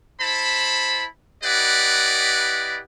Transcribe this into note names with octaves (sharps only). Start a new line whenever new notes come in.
E4 C5 A5 B5
E4 G4 B4 D5 D#5 F#5